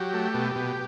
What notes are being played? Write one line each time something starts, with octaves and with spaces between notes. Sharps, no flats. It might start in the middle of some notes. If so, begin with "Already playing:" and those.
Already playing: F#3 G4
A3
B2
B2